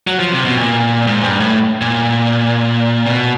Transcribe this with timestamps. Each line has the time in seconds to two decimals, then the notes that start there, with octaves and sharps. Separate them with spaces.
0.07 F#3
0.19 F3
0.32 C3
0.45 B2
0.57 A#2
1.07 G#2
1.23 G2
1.40 A2
1.81 A#2
3.06 B2